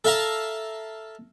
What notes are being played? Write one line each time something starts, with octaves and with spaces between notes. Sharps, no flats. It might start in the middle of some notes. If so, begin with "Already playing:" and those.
A4 E5 F5 A5 A#5